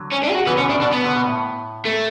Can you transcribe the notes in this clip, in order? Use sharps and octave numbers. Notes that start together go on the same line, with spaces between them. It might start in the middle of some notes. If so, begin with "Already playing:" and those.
Already playing: D3 F#3
C#4
D4
G#4
F#4
C#3 E3 B3
B2 D3 C#4
A2 C#3 D4
B2 D4
B3
B2 D3
B2
A2
A3